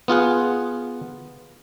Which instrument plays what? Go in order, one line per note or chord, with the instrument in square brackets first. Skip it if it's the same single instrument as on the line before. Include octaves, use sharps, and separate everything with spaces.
[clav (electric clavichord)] B3 F4 G#4 F#5